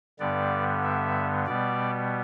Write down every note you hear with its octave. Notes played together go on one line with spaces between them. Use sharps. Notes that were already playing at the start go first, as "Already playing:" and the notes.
G2 D3 G3 B3 D5
E5
B2 G3 B3 D5